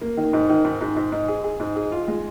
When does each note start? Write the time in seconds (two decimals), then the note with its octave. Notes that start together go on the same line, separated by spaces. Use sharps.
0.01 A#3
0.17 D#3
0.33 G#2
0.49 D#3
0.65 G#2
0.81 G#2
0.96 G#2
1.12 G#2
1.28 G#4
1.44 G#4
1.60 G#2
1.76 G#4
1.92 F4
2.08 G#3